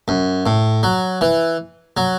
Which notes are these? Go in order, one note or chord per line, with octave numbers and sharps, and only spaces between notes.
F#2
A2
F#3
E3
F#3